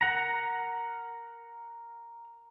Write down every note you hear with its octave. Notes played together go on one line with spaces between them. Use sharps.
A#4 F#5 A#5